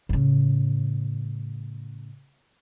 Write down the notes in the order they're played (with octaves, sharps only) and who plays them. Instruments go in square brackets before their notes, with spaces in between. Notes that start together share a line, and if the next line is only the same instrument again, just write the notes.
[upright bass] A2 C#3